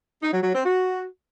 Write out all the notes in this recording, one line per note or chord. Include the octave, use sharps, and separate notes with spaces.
D#4
F#3
F#3
C4
F#4